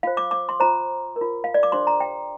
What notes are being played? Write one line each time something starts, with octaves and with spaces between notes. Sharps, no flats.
F4 C5 F5
D6
D6
C6
F4 C5 A#5
A#4
F4
F5
D5
D6
D4 G4 C5 C6
A#5
G5